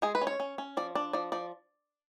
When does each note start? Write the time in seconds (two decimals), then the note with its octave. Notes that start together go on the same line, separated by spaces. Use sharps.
0.02 G#3 G#4
0.15 B4
0.21 C#4
0.27 C#5
0.40 C#4
0.58 C#4
0.77 F3 D5
0.95 D4 D5
1.13 F3 D5
1.32 F3 D5